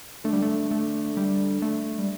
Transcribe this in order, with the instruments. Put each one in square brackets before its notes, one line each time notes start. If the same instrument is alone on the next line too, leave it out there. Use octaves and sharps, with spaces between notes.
[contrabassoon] D3 [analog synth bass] A3
[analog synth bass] G3
A3
A3
G3
A3
G3